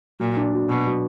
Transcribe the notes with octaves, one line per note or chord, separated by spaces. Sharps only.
A#2 F#3
D4
F#4
B2 B3
F#3